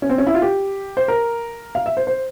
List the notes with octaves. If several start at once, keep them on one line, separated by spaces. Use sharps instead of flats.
C#4
C4
C#4
E4
F4
G4
C5
A#4
F5
E5
C5
C5